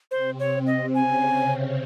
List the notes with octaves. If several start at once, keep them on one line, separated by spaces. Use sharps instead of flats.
C3 C4 C5
C#5
D#5
C#3 C#4 G#5